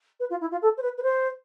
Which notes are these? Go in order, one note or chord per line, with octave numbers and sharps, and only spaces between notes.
B4
F4
E4
F4
A4
C5
B4
B4
C5